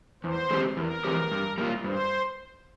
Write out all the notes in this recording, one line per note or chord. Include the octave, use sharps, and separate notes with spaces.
E2 C5
E3 G#3 C4 G4
E2 A#4
E3 G#3 C4 G4
G2
G3 A#3 F4
G2 C5